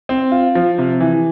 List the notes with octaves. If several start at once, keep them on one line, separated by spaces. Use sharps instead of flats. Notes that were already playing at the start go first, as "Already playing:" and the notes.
C4
F4
F3
C3
E3